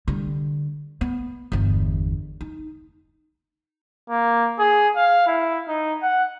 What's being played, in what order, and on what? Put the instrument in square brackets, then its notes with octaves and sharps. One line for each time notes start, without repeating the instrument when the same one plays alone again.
[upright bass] D3 G3
B3
G1 E2
D#4
[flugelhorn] A#3
G#4
F5
E4
D#4
F#5